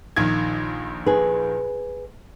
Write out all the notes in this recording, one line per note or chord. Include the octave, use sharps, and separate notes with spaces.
A#1 D#3 G#6
G#4 B4